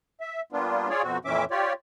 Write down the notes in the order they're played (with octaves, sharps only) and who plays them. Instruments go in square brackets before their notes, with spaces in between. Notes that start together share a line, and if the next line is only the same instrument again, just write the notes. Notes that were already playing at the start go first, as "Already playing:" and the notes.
[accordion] E5
G3 A#3 B3 D4 F4
F4 G#4 C#5 D5
F2 B2 C4 F#4
F2 A#2 E3 C#4 E5 D6
F4 G4 C#5 D5